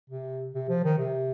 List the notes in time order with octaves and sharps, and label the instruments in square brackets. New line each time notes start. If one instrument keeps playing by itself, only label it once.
[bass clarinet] C3
C3
F3
D#3
C3